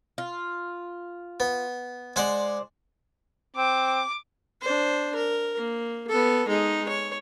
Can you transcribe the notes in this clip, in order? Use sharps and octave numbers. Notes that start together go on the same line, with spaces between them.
F4
B3
G#3 C5 D5 F#5 C6
C4 D6
D4 C5
A#4
A#3
B3 A4
G#3 D#4
C#5